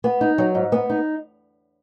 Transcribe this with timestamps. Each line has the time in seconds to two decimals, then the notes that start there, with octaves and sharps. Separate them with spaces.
0.04 B3
0.21 D#4
0.38 F#3
0.55 G#2
0.72 B3
0.90 D#4